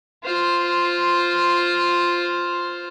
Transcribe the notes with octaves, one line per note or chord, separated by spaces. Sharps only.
F4 C5